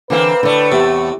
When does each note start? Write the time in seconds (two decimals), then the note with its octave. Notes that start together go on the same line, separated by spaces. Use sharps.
0.10 D3 E3 A#3 C4 B4 F5
0.43 A2 D3 A3 D5
0.72 E2 C3